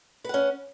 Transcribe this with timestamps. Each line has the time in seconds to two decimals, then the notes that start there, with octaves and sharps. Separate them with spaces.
0.24 B4
0.29 F#5
0.34 C#4